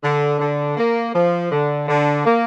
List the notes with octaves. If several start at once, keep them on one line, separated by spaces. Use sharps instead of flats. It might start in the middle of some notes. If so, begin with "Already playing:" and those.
D3
D3
A#3
F3
D3
D3
A#3